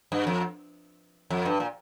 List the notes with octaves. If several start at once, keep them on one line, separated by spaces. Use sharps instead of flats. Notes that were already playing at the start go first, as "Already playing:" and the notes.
G2
F2
F2
G2
A#2